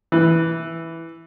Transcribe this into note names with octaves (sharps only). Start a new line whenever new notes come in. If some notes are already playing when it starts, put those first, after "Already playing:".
E3